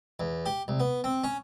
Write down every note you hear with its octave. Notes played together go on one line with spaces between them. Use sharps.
E2
G4
C2
B3
C4
C#4